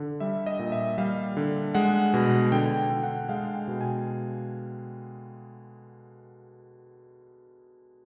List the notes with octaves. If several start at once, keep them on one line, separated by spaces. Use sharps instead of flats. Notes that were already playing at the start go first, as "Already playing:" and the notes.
Already playing: D3
G3 E5
D#5
A#2
E5
G3 F5
D3
G#3 F#5
B2
D3 G5
D3
F#5
G#3 F5
G5
B2
G#5